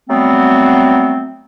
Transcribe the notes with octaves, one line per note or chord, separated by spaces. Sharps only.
F#3 G3 A3 B3 C4